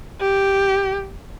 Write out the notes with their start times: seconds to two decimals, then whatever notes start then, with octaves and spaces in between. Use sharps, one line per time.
0.21 G4